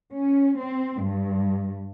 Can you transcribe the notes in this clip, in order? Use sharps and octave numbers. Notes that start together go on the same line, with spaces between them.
C#4
C4
G2